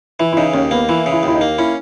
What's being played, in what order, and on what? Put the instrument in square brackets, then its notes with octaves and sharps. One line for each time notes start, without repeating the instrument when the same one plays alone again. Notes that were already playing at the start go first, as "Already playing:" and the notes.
[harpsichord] E3 [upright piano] E4
[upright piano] E4
[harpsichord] C#3 [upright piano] D#4
[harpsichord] D#2 [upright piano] C#4
[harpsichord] A#3 [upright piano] B3
[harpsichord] E3 [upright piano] E4
[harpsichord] C#3
[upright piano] E4
[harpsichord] D#2 [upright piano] E4
[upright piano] D#4
[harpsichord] A#3
[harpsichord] C#4 [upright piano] E4